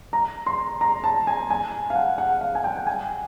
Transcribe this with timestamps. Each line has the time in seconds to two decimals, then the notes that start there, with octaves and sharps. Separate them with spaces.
0.13 A#5
0.46 C6
0.81 A#5
1.04 A5
1.27 G#5
1.50 G#5
1.90 F5
1.96 F#5
2.18 F#5
2.41 F5
2.55 G#5
2.64 G5
2.87 G#5